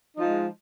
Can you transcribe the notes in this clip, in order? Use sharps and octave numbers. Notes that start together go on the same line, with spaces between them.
F3 G#3 D#4